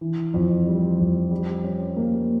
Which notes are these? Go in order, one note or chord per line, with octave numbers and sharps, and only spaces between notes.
E3
F2
G3
F2
G3
C#4
A#3